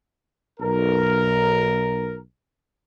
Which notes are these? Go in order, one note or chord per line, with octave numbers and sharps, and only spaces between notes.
B1 A#4